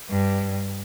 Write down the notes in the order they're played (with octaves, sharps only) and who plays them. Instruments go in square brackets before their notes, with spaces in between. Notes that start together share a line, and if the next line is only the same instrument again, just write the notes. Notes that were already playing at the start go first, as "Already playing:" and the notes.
[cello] G2